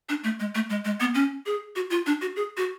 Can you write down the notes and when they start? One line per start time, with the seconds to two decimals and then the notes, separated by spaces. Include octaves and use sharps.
0.09 D4
0.24 A3
0.40 G#3
0.55 A3
0.70 G#3
0.85 G#3
1.00 B3
1.15 C#4
1.46 G#4
1.76 F#4
1.90 F4
2.06 D4
2.21 F#4
2.36 G#4
2.57 F#4